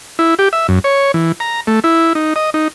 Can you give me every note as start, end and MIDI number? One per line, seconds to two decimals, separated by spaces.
0.19 0.35 64
0.39 0.49 67
0.53 0.67 76
0.69 0.79 42
0.84 1.12 73
1.14 1.32 52
1.40 1.61 82
1.67 1.80 57
1.84 2.13 64
2.15 2.34 63
2.36 2.50 75
2.54 2.68 63